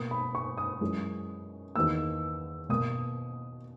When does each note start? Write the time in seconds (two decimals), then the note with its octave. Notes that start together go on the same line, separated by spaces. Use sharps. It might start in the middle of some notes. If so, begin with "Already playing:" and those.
Already playing: B2 A#3 D#6
0.11 B5
0.35 C#6
0.57 D#6
0.81 F#2 E3 G#3
1.76 E2 D#3 A#3 E6
2.69 B2 A#3 D#6